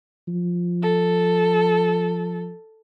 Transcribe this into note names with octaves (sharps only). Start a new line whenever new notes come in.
F3
A4